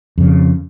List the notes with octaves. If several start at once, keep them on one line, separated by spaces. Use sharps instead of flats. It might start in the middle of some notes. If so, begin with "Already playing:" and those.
F2 C#3